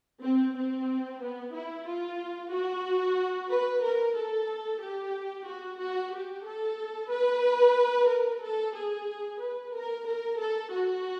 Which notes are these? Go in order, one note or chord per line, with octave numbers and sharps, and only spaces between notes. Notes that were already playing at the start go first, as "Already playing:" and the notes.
C4
C4
B3
E4
F4
F#4
B4
A#4
A4
G4
F#4
F#4
G4
A4
B4
A#4
A4
G#4
B4
A#4
A#4
A4
F#4